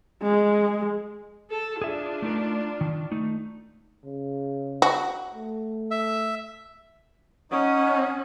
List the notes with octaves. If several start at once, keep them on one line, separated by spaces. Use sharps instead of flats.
G#3
A4 A5
D4 F4 G#4 E5
A3 D#4 A#4
D#3
A3 D#4
C#3
F#4
A3
E5
C#4 D#4 C#5 F#5 D#6